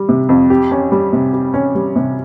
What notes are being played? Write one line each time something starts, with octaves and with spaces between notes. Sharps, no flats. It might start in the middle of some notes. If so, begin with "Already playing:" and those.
Already playing: G3
C3
F2
G4
C#4
G3
C3
G4
C#4
G3
C3